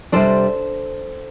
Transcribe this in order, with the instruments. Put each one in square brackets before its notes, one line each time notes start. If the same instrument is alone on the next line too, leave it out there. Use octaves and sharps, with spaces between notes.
[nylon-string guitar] C3 G3 D4 A4 C5